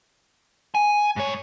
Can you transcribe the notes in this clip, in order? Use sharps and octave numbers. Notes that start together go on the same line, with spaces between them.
G#5
G#2 C#5